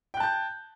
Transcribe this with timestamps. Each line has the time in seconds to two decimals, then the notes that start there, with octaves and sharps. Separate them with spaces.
0.14 G5
0.17 F#6
0.20 A5
0.23 G6